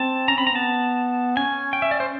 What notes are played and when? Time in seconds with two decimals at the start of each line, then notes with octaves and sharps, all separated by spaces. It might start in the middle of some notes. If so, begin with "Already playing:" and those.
Already playing: C4 A5
0.28 C#4 A#5
0.38 C4 B5
0.47 A#5
0.52 B3 A5
1.37 C#4 G#5
1.73 G5
1.82 E5
1.91 D5
2.00 C5